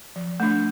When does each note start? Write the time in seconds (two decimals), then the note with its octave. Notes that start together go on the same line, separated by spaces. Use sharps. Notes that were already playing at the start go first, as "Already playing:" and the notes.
0.16 F3
0.40 A3 D4